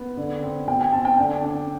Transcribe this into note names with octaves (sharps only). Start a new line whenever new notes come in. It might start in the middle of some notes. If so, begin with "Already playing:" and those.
Already playing: B3
D3
C4
B2 G5
G5
C4 A5
G5
D3 G5
D4